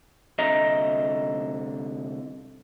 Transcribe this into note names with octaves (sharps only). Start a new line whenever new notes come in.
C2 D3 D#5 E5 A#5